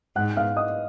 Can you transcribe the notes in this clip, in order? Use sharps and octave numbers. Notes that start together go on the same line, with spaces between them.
G#2 F#5 F#6
F5 F6
D#5 D#6